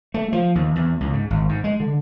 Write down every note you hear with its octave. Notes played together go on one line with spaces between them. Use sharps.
A3
F3
D#2
E2
C#2
G#2
G#1
G#2
G#3
D3